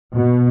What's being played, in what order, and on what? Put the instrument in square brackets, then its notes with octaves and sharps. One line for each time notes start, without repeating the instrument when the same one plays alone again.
[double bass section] B2